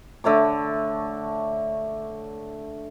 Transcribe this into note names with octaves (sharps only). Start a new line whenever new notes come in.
D3 A3 C#5 D6